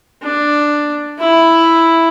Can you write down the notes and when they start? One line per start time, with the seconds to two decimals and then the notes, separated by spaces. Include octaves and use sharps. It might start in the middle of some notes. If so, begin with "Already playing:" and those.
0.23 D4
1.19 E4